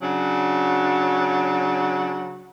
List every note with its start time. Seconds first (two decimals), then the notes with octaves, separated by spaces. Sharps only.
0.02 C#3 F#3 D4 F#4